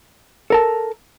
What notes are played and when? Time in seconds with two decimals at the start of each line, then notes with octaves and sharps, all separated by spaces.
0.50 A4 A#4 A5